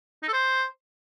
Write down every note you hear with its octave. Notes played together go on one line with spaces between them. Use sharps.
D#4
A4
C5